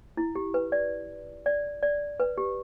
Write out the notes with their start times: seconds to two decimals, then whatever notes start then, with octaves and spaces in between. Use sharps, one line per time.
0.17 E4
0.35 G4
0.54 B4
0.72 D5
1.46 D5
1.83 D5
2.20 B4
2.38 G4